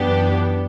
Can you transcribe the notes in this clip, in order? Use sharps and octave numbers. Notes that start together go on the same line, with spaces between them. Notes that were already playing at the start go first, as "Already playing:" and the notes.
Already playing: F#2 E3 B3 D4 G4